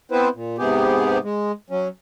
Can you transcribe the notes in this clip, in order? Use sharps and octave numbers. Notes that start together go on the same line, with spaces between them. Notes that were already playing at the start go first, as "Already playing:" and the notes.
B3 C4 E4 B4 C5
A#2
G#2 C3 B3 G4 G#4
G#3
F#3 C#4